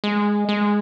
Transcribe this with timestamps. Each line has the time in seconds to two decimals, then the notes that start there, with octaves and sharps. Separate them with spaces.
0.04 G#3
0.49 G#3